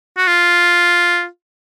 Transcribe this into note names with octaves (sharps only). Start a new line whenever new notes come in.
F#4
F4